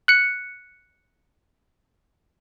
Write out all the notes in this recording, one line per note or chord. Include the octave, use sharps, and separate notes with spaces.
F#6 C#7